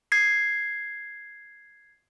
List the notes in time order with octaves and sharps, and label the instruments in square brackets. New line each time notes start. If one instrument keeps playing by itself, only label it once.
[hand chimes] G#6 C7